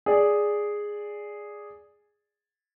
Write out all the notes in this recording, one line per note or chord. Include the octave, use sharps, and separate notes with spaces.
G#4 D5